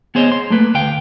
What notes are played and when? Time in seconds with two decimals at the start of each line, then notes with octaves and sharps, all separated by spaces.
0.15 B3 G#4 C5 C#5 D#5
0.32 C6
0.50 A3 A#3 B4
0.74 D2 F5 G5